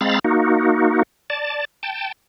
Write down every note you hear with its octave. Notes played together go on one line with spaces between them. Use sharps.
G#3 C4 F5 A#5 B5 A6
A#3 D#4 F#4
D5 A5
G5 A5